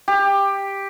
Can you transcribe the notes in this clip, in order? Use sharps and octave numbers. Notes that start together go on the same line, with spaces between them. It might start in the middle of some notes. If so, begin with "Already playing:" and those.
G4